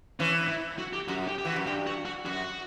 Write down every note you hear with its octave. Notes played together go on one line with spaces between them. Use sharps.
E3 C#4
E4
F#4
G4
F#2 F#4
G4
G4
E3 F#4
F#2
G2 G4
F#4
F#4
F#2 F#4